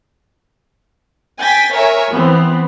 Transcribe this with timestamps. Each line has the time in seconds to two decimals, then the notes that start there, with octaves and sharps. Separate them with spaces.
1.41 G5 G#5 A6 B6
1.75 A#4 C#5 E5 G#5
2.13 E3 B3 C4